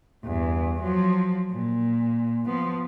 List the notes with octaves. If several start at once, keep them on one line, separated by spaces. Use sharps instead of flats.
E2 G2
F3 F#3
A#2
F3 B3